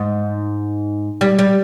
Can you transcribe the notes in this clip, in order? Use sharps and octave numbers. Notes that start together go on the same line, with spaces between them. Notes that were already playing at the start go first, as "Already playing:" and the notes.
Already playing: G#2
G3
G3